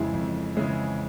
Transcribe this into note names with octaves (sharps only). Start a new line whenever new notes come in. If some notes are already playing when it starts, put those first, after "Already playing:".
Already playing: F2 C#3 E3 G#3 E4
F2
C#3 E3 G#3 E4